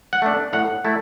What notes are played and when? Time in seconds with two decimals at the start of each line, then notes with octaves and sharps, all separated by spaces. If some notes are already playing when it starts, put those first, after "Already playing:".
0.13 F#5
0.22 A3 D4
0.53 A2 F#5
0.85 A3 E4